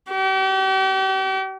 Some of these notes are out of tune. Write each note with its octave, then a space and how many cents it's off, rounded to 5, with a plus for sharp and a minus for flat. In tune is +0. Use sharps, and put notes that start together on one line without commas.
G4 -40